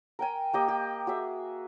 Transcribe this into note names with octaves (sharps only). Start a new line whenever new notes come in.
A#4 G5 G#5
A#3 G4 D#5
G4
F#4 G#4 E5